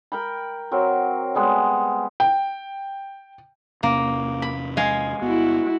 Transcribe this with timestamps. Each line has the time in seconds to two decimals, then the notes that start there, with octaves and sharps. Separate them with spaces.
0.12 A#4 G5 B5
0.71 F#3 C4 A#4
1.35 G3 G#3 B3
2.20 G5
3.83 E2 C3 A#3 C#4
4.42 B5
4.77 G#3 F5 G#5
5.22 G1 B3 E4 F#4